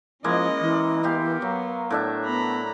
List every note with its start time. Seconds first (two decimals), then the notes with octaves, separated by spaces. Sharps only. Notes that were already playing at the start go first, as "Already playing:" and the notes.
0.24 F3 G#3 A#3 C#4 E4 D#5
0.61 E3
1.03 B3 G4 F5 C6
1.42 F#3 F5
1.90 A2 D4 E5
2.26 B3 A#5 B5